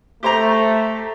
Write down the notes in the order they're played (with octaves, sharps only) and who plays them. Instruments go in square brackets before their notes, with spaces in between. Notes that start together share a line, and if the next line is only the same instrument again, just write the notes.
[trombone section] A3 [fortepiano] G4 C5 A#5